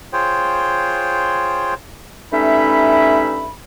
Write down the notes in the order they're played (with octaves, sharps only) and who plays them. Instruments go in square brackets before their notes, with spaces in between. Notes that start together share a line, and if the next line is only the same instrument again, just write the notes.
[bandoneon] F4 G#4 C5 C#5 G5
[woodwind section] G2 A3 C#4 D#4 E5 B5